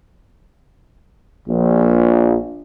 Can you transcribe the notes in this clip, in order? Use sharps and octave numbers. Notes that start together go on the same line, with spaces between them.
A#1